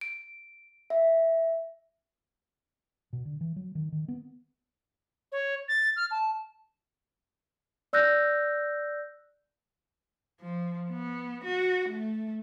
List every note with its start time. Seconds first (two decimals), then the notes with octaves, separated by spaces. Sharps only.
0.01 D7
0.90 E5
3.13 B2
3.25 D3
3.41 E3
3.56 F#3
3.75 D#3
3.92 D#3
4.08 B3
5.32 C#5
5.68 A6
5.96 F6
6.11 A5
7.93 D5 E6 F#6 G6 A#6
10.41 F3
10.90 B3
11.44 F#4
11.88 A3